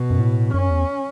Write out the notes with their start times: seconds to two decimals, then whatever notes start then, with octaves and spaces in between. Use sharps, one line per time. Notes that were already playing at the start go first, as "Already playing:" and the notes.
Already playing: B2
0.10 F#2
0.20 A2
0.54 F#2 C#4
0.70 E2